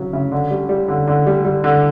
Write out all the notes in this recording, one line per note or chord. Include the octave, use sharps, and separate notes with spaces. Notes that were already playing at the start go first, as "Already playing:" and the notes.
Already playing: C#3 F#3
C#3
D3
G3
G3
D3
D3
G3
G3
D3